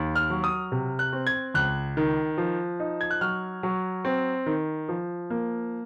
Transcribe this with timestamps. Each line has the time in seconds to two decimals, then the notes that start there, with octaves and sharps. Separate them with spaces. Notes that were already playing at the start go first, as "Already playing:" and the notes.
Already playing: D#2
0.15 F6
0.30 F#3
0.44 D#6
0.72 C3
0.99 F#6
1.13 C4
1.27 G#6
1.54 C#2 F#6
1.97 D#3
2.38 F3
2.80 D#4
3.01 G#6
3.11 F#6
3.21 F#3 F6
3.63 F#3
4.05 C4
4.46 D#3
4.89 F3
5.30 A#3